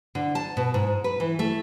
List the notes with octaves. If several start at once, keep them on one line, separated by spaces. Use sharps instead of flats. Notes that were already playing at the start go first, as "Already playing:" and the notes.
D3
A5
B2
G#2
B4
E3
A3